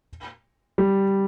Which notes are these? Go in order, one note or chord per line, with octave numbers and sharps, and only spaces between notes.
G3